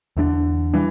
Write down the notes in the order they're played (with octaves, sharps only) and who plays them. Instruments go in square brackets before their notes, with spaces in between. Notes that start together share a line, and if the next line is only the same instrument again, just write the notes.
[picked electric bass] E2 E3 A#3 D4 [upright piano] D3
[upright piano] E3 [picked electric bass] G3 D4